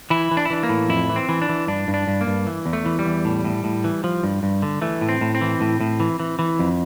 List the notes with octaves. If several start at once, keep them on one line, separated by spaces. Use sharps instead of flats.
E3 E4
E3
D4
E4
E3 D4
A#3
A2
F2 E4
E3
C4
E3
D4
E3
G2 D4
G2
D4
G2
A#3
G2
E3
E2
A3
E3
G3
E2
A2
A2
A2
E3
F3
G2
G2
D3
E3 A3
A2
C4
A2
C4
E3
A2
A2
E3
E3
E3
F2